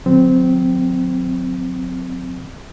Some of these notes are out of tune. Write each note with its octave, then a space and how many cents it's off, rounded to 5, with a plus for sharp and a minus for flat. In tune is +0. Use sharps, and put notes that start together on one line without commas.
D3 +0 F#3 -40 C4 -15